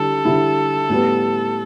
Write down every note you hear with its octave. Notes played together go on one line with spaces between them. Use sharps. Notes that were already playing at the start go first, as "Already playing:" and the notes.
Already playing: D3 G3 E4 A4
D3 G3 E4
A2 G3 B3